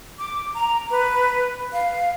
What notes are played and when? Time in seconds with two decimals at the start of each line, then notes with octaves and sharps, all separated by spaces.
0.19 D6
0.54 A#5
0.90 B4
1.73 F5